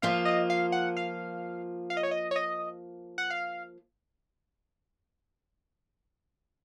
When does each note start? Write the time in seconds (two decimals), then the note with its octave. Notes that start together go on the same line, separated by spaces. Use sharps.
0.02 F3 A#3 F4 F5
0.25 D#5
0.50 F5
0.72 F#5
0.97 F5
1.90 F5
1.97 D#5
2.03 C#5
2.11 D#5
2.31 C#5
2.36 D#5
3.18 F#5
3.30 F5